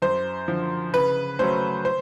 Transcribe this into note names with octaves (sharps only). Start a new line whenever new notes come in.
F#2 C5
D3 F3
C#3 B4
F#3 A3 C#4 C5
C5